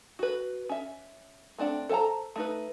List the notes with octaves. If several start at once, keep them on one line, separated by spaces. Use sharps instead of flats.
F#4 B4
C#4 E5
A3 C4 D4 F#5
A4 C5 F5 A5 A#5
A3 D#4 B4